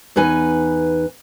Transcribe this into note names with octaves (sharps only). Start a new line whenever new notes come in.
E2 D#4 B4 G#5